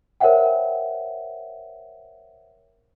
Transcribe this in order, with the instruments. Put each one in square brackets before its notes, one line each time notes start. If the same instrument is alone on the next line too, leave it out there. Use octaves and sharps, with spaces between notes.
[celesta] A#4 C5 C#5 E5 F#5 G5